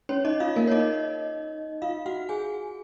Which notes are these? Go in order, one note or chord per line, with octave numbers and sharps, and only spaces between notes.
C#4 C#5
D#4 D#5
F4 F5
A#3 A#4
C#5
D#4 D#5
F4 F5
F#4 F#5
G#4 G#5